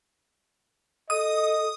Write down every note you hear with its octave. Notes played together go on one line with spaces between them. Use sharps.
A4 D#5 D#6